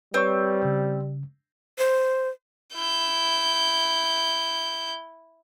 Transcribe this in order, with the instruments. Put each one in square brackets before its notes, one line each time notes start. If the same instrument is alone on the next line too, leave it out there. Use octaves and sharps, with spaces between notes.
[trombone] G3 [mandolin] C4 [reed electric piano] B4 C#5 C#6
[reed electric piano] C#3
[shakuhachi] C5
[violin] E4 G6